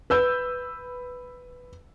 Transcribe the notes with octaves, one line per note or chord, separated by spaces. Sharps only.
B4 E6 G6